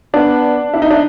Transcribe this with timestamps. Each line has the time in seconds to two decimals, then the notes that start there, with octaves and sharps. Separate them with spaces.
0.14 B3 D4
0.74 E4
0.82 D#4
0.91 D4